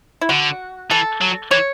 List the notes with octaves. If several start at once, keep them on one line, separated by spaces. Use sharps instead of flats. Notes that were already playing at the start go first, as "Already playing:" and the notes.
E4
D3 F#4
E3 A4
F#3
E3 C#5